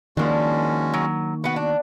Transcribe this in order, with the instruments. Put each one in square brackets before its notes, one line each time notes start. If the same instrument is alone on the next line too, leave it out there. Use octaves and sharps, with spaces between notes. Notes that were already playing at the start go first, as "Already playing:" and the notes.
[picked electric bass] D#3 A#3 [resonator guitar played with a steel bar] F3 D4 [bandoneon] G#3 C#4 F#4
[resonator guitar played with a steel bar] F#3
[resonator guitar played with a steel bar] B3 F#5 [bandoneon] F#4
[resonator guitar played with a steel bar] D4